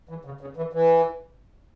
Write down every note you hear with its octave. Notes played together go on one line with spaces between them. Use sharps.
E3
C#3
C#3
E3
E3